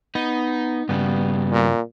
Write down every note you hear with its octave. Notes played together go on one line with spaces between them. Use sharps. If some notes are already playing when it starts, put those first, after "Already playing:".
B3 D#4
G2 C#3 G3 B3
A#2